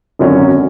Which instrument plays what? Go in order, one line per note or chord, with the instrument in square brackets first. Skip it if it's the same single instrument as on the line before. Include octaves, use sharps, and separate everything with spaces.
[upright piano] G#1 F#2 D3 F#3 C#4